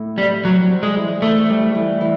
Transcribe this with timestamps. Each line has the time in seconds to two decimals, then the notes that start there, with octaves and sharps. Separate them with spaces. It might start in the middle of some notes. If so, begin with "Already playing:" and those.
Already playing: A2
0.17 G3 C4
0.44 F#3 G3
0.70 C4
0.83 G#3
0.96 E3
1.22 E3 A3
1.49 G3
1.75 E3
2.01 E3